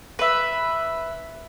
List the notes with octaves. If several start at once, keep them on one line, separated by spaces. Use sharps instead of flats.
B4 E5